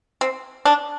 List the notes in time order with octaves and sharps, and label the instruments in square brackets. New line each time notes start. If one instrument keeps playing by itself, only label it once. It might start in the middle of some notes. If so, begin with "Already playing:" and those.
[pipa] C4
D4